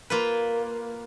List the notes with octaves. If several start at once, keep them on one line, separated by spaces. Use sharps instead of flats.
A#3 F4 B4